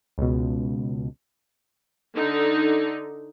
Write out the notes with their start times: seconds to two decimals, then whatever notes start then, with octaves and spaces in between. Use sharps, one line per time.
0.18 C#2 B2
2.17 D3 D#4